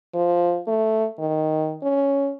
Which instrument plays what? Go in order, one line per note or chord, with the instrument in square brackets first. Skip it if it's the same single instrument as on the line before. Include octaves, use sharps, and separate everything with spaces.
[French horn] F3
A3
D#3
C#4